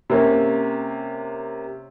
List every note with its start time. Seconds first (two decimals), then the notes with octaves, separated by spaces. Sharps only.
0.10 C3 A#3 C#4